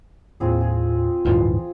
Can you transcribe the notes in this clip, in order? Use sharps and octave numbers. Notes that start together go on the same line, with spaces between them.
D#2 A2 C4 F4 G#4
G#4
D1 G2 E3 F4